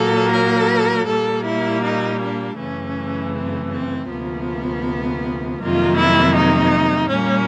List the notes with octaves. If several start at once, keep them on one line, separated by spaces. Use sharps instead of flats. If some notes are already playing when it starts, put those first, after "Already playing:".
Already playing: A#2 F#3 A#3 A4
A#4
A#2 G3 A#3 A4
E4
D#4
D4
F#2 C#3 E3 A3 C#4
C4
C4
D2 C3 F3 A#3 B3
F2 C3 D#3 F#3 A#3 F4
E4
D#4
A#2 G3 A#3 C#4